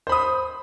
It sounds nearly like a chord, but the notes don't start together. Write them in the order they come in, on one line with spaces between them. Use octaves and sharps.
C5 B5 D#6